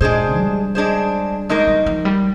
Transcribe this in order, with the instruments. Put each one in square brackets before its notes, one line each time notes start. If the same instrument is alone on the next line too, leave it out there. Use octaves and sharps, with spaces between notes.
[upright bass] A#2 [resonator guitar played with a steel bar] G#3 D4 G#4 C5
[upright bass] G3
[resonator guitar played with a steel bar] G#3 D4 G#4 C5
[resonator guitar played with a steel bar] D#3 A#3 D#4 A#4 [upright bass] G#3
[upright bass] G3
F3
G3